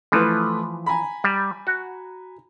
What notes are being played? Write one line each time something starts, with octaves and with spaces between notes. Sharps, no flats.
E3 F3 A3 E4 B4
G#5 A#5 B5
G3
F#4